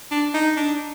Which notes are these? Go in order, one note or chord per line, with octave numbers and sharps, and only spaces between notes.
D4
D#4
D4